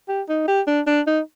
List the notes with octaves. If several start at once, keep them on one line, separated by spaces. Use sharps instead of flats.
G4
D#4
G4
D4
D4
D#4